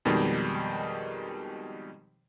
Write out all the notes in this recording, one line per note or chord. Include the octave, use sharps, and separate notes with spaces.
F2 B2 D#3 G3 G#3 D#4